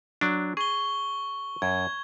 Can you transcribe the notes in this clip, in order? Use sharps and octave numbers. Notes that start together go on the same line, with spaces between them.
F#3 D4
G#4 C#6 G7
F#2 G#6